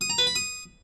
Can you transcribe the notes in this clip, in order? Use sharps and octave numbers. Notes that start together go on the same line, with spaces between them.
D#6
A#5
B4
B5
D#6